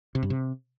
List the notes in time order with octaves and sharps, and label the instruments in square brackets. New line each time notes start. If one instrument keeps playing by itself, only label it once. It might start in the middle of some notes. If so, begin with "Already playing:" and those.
[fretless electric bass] C3
G2
C3